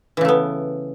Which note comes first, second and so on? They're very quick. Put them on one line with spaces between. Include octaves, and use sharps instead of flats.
E3 C#3 A3 B3